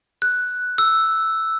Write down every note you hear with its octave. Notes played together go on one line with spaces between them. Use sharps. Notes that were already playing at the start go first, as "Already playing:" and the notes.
F#6
E6